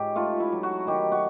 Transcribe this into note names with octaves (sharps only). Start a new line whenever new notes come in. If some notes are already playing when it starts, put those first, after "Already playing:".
Already playing: G#2 C#4 G4
A3 F4
E4
F#3
F#4
D#3 G4
F#4